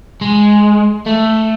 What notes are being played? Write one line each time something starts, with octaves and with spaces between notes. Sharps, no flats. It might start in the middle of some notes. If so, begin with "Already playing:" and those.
G#3
A3